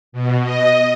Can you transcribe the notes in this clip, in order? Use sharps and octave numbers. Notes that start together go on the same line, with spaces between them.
B2
D#5